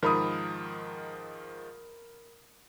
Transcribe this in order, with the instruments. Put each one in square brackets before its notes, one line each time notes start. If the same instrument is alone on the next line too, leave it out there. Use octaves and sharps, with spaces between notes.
[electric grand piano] G#2 D#3 F3 [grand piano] A#4 B5 D#6